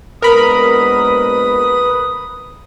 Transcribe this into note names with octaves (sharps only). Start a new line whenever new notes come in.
A#1 G#3 B3 A#4 B4 B5 D#6